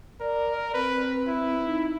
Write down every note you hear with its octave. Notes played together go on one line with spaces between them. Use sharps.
A#4 D5
C4 B4
E4
D#4